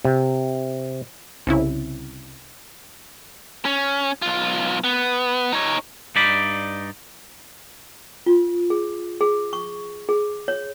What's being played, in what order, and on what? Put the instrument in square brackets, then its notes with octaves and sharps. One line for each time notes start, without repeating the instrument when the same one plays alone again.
[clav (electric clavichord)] C3
[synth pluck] C2 C#3 E4
[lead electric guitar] C#4
B1 F4
B3
D#4 C#5
[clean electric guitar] G2 D#4 D5 B5
[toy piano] F4
G#4
G#4
C#6
G#4
C#5